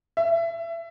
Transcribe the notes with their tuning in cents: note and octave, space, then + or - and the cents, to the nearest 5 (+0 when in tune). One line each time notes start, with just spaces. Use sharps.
E5 +25